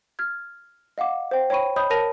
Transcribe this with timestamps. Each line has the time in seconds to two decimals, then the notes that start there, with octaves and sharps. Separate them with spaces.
0.19 F6 G#6
0.98 D#5 F5 F#5 D6
1.31 C5 G5
1.50 C#5 G5 B5 C#6 D#7
1.76 C#5 D#5 B5 D#6 G6
1.90 A#4 C#5 A5 A#6 D#7 F7